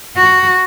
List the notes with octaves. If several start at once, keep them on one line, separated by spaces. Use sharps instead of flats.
F#4